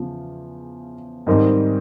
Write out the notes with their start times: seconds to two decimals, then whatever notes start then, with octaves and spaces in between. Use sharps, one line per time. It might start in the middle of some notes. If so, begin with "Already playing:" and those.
Already playing: E2 C#3 F3
1.27 G#2 D#3 G3 C4 D#4